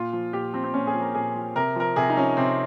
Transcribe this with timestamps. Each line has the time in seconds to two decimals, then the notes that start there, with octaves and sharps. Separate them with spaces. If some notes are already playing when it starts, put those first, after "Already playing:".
Already playing: A#2 F4
0.13 F3
0.33 A#2 G4
0.53 F3 C4
0.64 C4
0.74 A#2 C#4
0.87 G#4
0.94 F3
1.01 A#4
1.14 A#2 G#4
1.35 F3
1.56 C3 A#4
1.76 F3 A#4
1.96 C3 G#4
2.10 D#4
2.17 F3 C#4
2.37 C3 C4